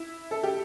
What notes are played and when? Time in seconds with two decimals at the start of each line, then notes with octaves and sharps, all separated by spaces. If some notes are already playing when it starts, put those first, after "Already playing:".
Already playing: E4
0.31 A4
0.44 G4